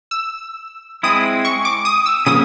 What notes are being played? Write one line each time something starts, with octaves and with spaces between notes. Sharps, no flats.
E6
G#3 C4 E4 D#6
C#6
D6
D#6
E6
C#3 F3 A#3 D#6